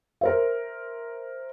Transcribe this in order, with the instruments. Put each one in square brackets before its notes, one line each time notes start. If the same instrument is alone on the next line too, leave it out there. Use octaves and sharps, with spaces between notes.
[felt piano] A#4 C5 E5